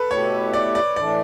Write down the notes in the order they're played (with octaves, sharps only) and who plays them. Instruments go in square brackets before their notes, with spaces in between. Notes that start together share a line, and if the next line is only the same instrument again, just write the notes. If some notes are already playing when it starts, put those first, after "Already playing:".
Already playing: [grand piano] A4 B4
[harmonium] B2 A3 E4 G4 [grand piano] C#5
[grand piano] D5
D5
[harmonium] A2 E3 A3 D4 [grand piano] D5